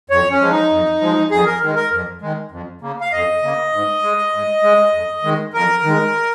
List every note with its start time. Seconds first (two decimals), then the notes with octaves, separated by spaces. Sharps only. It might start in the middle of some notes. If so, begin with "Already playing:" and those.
0.10 F2 C#5
0.31 C#4
0.41 F3 G#3
0.51 D#4
0.71 F2
1.01 F3 G#3
1.31 F2 G#4
1.46 A#4
1.61 D#3 G#3
1.76 A#4
1.92 F2
2.22 D#3 G#3
2.51 F2
2.81 C#3 A#3
3.01 F5
3.12 F2 D#5
3.43 C#3 A#3
3.72 G#2
4.03 G#3
4.33 G#2
4.63 G#3
4.93 F2
5.23 D#3 G#3
5.54 F2 A#4
5.83 D#3 G#3